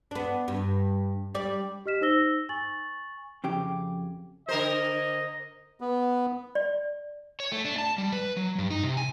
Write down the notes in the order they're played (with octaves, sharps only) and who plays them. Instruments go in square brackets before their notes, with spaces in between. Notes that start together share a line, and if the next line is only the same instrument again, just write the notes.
[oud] B3 D4
G2
G3 D5
[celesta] G4 D#5 F6 B6 E7
D#4 C5 E6 A#6 G7
G#5 C#6 A6 F#7
[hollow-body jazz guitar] F2 C#3 G4
[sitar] D3 A#4 C5 [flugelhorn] D#5
[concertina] B3
[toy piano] D5
[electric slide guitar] C#5
A3
D4
A5
G3
B4
F#3
G2
D#4
C3
G#5